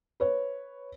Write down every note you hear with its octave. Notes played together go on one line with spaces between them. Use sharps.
B4 C#5